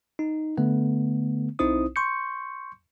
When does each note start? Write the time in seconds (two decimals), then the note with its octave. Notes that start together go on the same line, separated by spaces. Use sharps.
0.19 D#4
0.58 D3 A3 B3
1.59 B1 C4 D#4 E4 C5 D#6
1.96 C6 C#6 G6 C#7